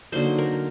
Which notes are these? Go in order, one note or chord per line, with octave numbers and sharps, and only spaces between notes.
D3 F#3 A#3 D#4 C5
A#4